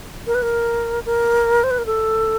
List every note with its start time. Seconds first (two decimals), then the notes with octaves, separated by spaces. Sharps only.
0.27 A#4
0.35 B4
0.42 A#4
1.06 A#4
1.64 C5
1.71 B4
1.78 A#4
1.86 A4